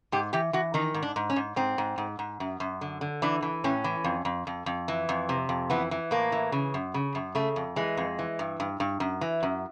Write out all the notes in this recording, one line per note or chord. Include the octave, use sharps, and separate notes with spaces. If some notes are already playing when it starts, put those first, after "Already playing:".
G#2 G4
E3 G4
E3 F#4
D#3 D#4
G#2
D4
G#2
C#4
G#2
G#2 C4
G#2
G#2
G#2
F#2
F#2
D3
D3
E3 D4
E3
A2 C#4
E3
F2
F2
F2
F2
E3
F2
C3
F2
E3 B3
E3
A2 A#3
E3
C#3
F#2
C#3
F#2
C#3 A3
F2
E3 G#3
F2
E3
G2
G2
G2
F#2
E3
F#2